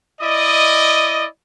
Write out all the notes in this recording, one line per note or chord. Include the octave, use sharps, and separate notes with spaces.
E4 D5 D#5